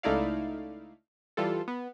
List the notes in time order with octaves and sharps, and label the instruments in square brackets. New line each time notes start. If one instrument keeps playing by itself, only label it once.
[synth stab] C#2 A3 D#4 E4 D5 F5
E3 G3 F4 A4
B3